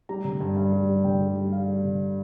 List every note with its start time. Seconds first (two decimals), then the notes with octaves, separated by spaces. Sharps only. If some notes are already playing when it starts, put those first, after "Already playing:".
0.09 G3 A#5
0.24 D3
0.40 G2
0.57 G2
0.73 G3
0.89 G3
1.04 D3 G5
1.21 G3
1.36 G3
1.53 G3 F5
1.68 G3
1.84 D3